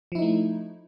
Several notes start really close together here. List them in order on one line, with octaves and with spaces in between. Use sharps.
F3 E4 D#4 A3